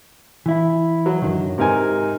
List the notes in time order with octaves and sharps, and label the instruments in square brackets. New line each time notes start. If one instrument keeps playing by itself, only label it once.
[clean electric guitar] E3 E4
[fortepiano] F#3
[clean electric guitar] F#2 D3 D#3
[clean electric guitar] G#2 D#4 [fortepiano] C3 A#4 G#5